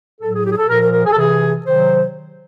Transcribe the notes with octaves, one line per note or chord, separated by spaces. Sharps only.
A2 F#3 A4
G#4
G4
G#4
A4
A#2 F3 A#4
A#4
A#4
G#4
A4
C3 E3 G#4
C3 D#3 F#3 C5